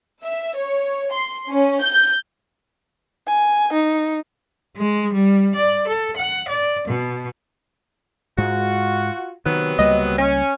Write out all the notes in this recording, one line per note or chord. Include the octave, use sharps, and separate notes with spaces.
E5
C#5
C6
C#4
G6
G#5
D#4
G#3
G3
D5
A4
F#5
D5
B2
G#2 G#3 F4 F#4
C3 D#3 F#3 B3
C#2 G3 A#3 D#5
C#4